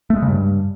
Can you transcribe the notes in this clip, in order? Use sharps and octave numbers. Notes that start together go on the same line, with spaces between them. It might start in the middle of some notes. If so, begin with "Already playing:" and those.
A3
G#3
C#3
G2